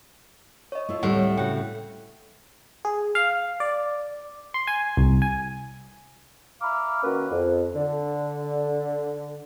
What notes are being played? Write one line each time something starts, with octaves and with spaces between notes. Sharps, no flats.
C#5 D#5
A3 E4 F4
D2 A2 G3 C4 F#5
C#3 F#4 F#5 G5
G#4
F5
D5
C6
G#5
C2
G#5
E5 F5 A#5 B5 D6 F6
D#3 A#3 C#4 F#4 A#4 B4
F2
D3